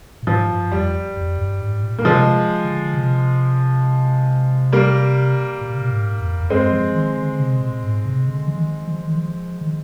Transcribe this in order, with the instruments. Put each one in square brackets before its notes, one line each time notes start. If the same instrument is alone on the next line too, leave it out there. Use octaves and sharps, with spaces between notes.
[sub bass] A#2
[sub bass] G#2 [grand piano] F3
[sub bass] G2
[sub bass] F2 [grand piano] G3
[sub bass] F2
G2
G#2
A#2
[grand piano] A#3
[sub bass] C3 [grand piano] F3 G#3
[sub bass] D3
C3
[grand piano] G3 A#3
[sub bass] A#2
C3
A#2
G#2
F2
F2
[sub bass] G2 [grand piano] G#3 C4
[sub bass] F3
D#3
D3
C3
A#2
G#2
C3
D3
F3
D#3
F3
D#3
F3
D#3